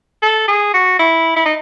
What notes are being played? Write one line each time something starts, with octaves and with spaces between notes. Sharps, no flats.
A4
G#4
F#4
E4
E4
D#4